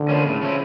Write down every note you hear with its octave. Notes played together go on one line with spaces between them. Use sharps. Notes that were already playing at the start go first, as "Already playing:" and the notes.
Already playing: D3
F3 A#3 C#4
A2 C#3
F3 C#4 E4